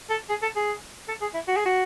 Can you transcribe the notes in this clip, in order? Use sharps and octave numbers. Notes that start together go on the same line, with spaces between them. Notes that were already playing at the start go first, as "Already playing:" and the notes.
A4
G#4
A4
G#4
A4
G#4
E4
F#4
G#4
F#4